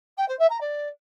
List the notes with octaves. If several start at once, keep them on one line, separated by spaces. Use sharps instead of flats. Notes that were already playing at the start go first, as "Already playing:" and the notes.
G5
C5
E5
A#5
D5